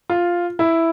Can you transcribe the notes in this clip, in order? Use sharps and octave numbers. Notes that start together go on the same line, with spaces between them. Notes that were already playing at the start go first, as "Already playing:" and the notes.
F4
E4